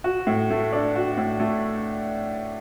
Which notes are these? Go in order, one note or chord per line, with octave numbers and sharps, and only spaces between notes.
F#4
A2
A3
D4
F#4
A2
A3